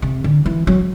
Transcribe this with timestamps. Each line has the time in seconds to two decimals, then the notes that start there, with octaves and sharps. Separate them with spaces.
0.02 C3
0.24 D3
0.46 E3
0.67 F#3